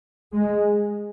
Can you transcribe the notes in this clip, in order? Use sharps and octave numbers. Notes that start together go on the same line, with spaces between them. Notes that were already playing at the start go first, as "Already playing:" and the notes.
G#3